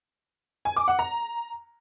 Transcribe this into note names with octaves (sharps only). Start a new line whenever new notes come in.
G#5
D6
F#5
A#5